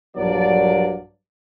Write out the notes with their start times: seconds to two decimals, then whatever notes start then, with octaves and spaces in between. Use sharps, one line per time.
0.17 A#1 G2 F#3 A#3 D4 D5